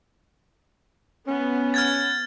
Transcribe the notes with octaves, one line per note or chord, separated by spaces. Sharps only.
B3 C#4
F6 G#6 A6